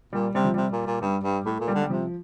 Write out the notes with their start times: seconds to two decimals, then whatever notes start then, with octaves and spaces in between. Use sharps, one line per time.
0.13 A#2 G3
0.35 C3 G3
0.44 F3
0.54 C3 G3
0.72 A#2
0.87 A#2
1.01 G2 G3
1.23 G2
1.45 A2 A3
1.60 A#2
1.68 G3
1.75 D3
1.82 G3
1.90 C3 F3